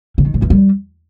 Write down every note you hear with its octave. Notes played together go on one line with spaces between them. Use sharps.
C#3
D#3
A2
E2
G3